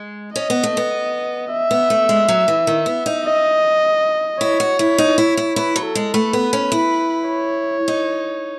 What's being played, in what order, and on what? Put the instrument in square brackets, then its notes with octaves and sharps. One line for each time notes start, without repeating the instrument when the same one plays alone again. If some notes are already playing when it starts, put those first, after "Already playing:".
Already playing: [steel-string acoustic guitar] G#3
[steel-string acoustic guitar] C#4 [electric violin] D#5
[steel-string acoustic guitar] B3
A3
B3
[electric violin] E5
[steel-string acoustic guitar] B3
A3
G#3
F#3
E3
D#3
B3
D#4
[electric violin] D#5
[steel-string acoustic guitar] E4 [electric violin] C#5
[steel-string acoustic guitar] F#4
E4
D#4
E4
E4
[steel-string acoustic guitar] E4 [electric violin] B4
[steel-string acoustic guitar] F#3
[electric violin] A4
[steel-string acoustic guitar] G#3
[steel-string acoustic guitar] A3 [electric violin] B4
[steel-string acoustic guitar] B3
C#4
E4
[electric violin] C#5
[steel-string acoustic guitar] D#4